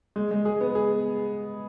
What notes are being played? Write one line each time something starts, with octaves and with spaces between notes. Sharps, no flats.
G#3
G#3
G#4
B3
G#4